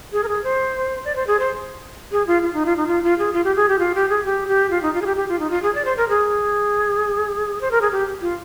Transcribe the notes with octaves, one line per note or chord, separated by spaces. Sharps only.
G#4
A#4
G#4
C5
D5
C5
G#4
C5
G#4
F4
F4
D#4
F4
D#4
F4
F4
G#4
F4
G4
G#4
G4
F4
G4
G#4
G4
G4
F4
D#4
F4
G#4
G4
G4
F4
D#4
F4
G#4
D5
C5
A#4
G#4
C5
A#4
G#4
G4
F4